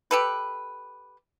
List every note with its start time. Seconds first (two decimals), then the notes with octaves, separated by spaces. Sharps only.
0.11 G4 A4 B4